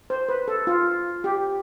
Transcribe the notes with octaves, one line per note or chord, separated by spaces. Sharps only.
C5
B4
A4
F4
G4